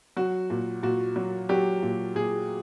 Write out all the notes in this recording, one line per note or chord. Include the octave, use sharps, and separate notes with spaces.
F#3 F#4
A#2
A#2 F#4
F#3
F#3 G4
A#2
A#2 G#4